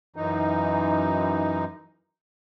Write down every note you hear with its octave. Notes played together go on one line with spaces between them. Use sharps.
F#2 E3 D#4